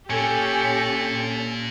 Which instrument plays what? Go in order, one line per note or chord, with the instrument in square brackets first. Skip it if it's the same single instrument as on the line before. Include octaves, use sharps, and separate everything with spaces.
[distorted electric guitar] A#2 [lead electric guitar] C#4 [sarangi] G4 [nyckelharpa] A4